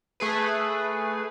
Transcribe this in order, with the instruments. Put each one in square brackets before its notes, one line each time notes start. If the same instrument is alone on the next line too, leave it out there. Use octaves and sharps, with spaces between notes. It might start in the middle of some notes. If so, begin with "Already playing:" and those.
[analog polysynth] A3 G#4 B4